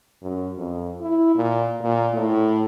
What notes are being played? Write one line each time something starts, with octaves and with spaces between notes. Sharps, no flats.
F#2
F2
E4
A#2
A#2
A2